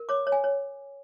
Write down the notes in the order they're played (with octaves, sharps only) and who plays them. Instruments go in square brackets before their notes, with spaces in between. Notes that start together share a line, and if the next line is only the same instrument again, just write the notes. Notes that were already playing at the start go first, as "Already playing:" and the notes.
Already playing: [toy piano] A#4
C#5 D6
C#5
G#5
C#5